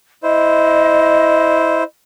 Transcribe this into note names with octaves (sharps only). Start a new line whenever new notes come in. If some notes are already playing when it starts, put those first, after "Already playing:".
E4 C5 D#5